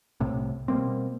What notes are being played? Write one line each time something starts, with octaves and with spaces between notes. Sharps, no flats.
C2 A2 C3
B2 G3 A#3 C4